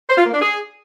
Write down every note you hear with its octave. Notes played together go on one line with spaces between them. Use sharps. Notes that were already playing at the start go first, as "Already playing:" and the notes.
C5
F4
A#3
D4
G#4